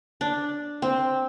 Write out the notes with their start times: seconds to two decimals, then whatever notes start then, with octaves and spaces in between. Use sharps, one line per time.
0.21 D4
0.82 C4